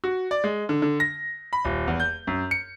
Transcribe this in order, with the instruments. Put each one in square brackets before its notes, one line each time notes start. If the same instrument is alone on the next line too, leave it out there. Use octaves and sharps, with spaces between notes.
[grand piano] F#4
D5
G#3
D3
D3
A#6
B5
D#1
E2
G6
F#2
C#7